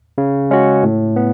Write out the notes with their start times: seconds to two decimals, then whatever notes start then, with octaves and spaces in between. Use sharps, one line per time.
0.18 C#3
0.51 G#3 C#4 F#4
0.83 A2
1.16 B3